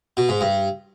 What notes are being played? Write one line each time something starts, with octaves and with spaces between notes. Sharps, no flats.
B2
G#2
G2